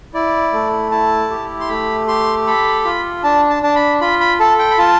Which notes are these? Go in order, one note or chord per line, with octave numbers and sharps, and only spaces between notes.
E4 D5
A3
E4 A5
G4
C6
A3 B5
G4 C6
A4 B5
F4
D4 A5
A5
D4 A5
B5
F4 B5
B5
A4 A5
G5
B5
F4 A5